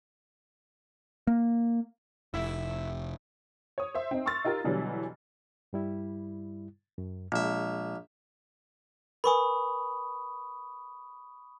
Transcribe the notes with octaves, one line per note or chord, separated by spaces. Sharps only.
A#3
F1 E4
C#5 D#6
C5 E5
C4 D#4
C6 C#6 E6 F6 A6
D#4 F4 G4 A#4
B2 D3 E3 F#3 G3
G2 G3 E4
F#2
A#1 A#2 G#3 E5
A#4 B4 G#5 B5 C#6 D#6